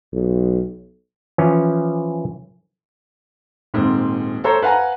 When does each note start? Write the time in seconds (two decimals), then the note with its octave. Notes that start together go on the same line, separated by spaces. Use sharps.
0.13 B1
1.38 E3 F3 C#4
3.74 D#1 G#2 C4
4.44 A4 C5 C#5 A#5
4.62 B4 F5 F#5 G#5 A#5